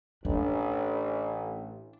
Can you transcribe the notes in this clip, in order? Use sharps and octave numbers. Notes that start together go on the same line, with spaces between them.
A1 D4